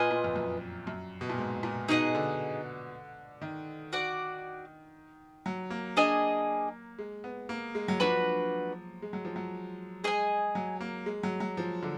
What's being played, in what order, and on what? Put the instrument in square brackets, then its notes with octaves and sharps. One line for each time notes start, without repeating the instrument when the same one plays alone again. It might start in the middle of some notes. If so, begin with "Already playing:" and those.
Already playing: [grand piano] A#2 [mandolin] F4 B4 D#5 G#5
[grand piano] A#2
F2
F#2
F#2
B2
A#2
G#2
A#2
[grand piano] B2 [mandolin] D#4 G#4 D#5 F#5
[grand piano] D3
D#3
[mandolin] F#4 D5 F#5
[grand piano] F#3
A#3
[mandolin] D4 G#4 D#5 G#5
[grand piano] G#3
B3
A#3
G#3
F#3
[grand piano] F3 [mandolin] D4 F#4 B4
[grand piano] G#3
F#3
F3
F#3
[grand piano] G#3 [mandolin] G#4 D#5 G#5
[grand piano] F#3
A#3
G#3
F#3
F#3
F3
D3